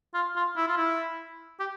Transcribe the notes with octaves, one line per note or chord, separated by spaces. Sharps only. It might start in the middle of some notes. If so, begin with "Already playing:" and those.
F4
F4
E4
F4
E4
G4